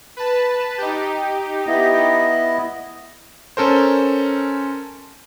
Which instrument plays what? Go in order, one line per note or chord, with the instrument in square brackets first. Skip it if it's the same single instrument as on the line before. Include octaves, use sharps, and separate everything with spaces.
[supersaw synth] B4 A5
D#4 G4
[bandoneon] B3 E4 D#5
[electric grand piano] C#4 A4 A#4 C5